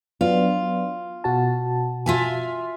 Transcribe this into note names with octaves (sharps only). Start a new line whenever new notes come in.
F#3 B3 D4 F4
B2 F#4 A5
F4 E5 G#5